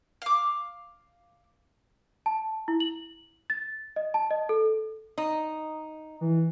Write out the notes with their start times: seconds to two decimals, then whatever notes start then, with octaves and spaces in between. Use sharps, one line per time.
0.22 F5 D6
2.26 A5
2.68 E4
2.80 F#7
3.50 A6
3.96 D#5
4.14 A5
4.31 D#5
4.49 A4
5.18 D#4
6.21 E3